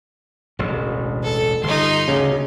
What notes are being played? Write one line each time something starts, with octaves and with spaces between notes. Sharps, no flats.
E1 A1 D2
A4
G1 D#4 C6
D2 C#3